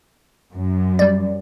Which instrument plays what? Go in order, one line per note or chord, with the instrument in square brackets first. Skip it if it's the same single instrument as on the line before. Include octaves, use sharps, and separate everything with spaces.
[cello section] F#2
[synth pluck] G3 D5